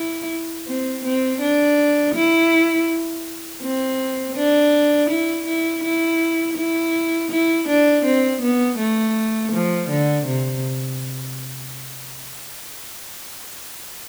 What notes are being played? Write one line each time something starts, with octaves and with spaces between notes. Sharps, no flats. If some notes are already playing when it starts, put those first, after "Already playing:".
Already playing: E4
C4
C4
D4
E4
C4
D4
E4
E4
E4
E4
E4
D4
C4
B3
A3
F3
D3
C3